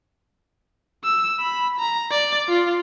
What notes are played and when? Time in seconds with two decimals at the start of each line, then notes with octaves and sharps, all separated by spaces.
1.04 E6
1.40 B5
1.79 A#5
2.11 D5
2.49 F4